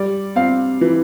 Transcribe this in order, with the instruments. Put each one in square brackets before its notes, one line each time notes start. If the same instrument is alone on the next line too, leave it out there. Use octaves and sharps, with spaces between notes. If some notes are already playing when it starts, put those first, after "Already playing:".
Already playing: [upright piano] G3 D5
C4 F5
E3